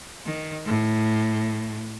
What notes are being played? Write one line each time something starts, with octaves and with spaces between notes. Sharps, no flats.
D#3
A2